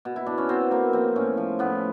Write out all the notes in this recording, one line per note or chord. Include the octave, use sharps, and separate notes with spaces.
B2
E4
B2 D4
C#4
B2 C4
A#3 C4
F3 C4
A2 C#4
F3
A2 B3